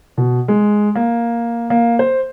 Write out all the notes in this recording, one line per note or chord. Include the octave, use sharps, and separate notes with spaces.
B2
G#3
A#3
A#3
C5